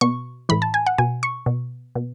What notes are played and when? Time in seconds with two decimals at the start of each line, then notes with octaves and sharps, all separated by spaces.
0.01 B2 C#6
0.49 A2 E3 B5
0.62 A5
0.74 G#5
0.86 F#5
0.98 B2 G#5
1.23 C#6
1.46 B2
1.95 B2